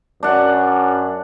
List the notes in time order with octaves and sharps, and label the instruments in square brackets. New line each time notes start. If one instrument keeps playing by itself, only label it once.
[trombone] F#2 [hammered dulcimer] D4 F#5